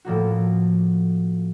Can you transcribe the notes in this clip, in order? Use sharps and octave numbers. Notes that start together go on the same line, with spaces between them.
A2 F3 A#3 F#4